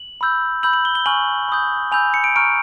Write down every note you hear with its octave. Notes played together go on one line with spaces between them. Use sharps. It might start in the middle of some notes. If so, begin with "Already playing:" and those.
Already playing: F#7
B5 E6 G6
B5 E6 G6 F#7
F#7
G7
G7
G#5 C#6 F6 F#7
B5 D#6 G6
G#5 B5 E6 G6 F7
C#7
D7
A#5 C#6 F6 D7